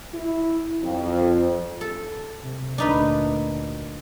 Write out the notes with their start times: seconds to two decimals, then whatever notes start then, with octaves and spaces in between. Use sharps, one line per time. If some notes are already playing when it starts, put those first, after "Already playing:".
0.14 E4
0.83 F2
1.81 A4
2.43 C3
2.78 D2 A#2 D4 D#4 B4